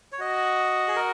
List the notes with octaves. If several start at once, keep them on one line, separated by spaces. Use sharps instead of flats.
C#5
F#4 D#5
G#4
A#4